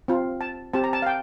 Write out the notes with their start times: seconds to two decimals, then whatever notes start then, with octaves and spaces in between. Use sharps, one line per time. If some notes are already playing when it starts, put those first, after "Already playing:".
0.08 C4 F4
0.41 A5
0.73 C4 G4 A5
0.84 A#5
0.93 A5
1.02 F5
1.06 G5